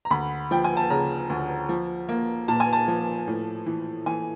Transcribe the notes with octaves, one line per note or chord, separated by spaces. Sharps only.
A#5
D2 B5
F3 G5
G#5
A5
C#3 A#5
D2
F3
A#3
A#2 A5
G#5
A5
F3
A2
E3
E3 G#5